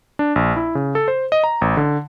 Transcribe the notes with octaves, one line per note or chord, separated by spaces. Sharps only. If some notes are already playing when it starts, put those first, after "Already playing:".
D4
A#1
E4
C#3
A4
C5
D#5
A#5
A1
D3